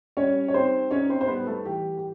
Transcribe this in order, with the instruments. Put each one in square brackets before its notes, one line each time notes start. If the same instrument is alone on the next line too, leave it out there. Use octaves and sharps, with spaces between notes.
[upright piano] G3 C#4 C#5
C#5
C4 D#4 C5
C#4 D#4 C#5
C4 C5
C5
G3 B3 B4
A3 A4
E3 G4
G4